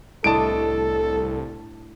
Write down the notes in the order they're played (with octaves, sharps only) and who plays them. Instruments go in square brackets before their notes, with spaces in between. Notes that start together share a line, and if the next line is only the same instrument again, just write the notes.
[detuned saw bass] C2 [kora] A2 D4 D#5 [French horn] A4 [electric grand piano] A5 D7